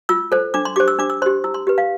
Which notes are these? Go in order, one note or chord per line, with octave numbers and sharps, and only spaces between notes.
F4 E6
A4 C5
D4 D6
C6
G4 C5 D6
E6
D4 D6
E6
G4 C5 C6
E4 E6
C6
G4 B4
F5